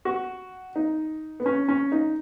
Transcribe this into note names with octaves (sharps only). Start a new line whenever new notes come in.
F#4
D#4
B3
C#4
C#4
D#4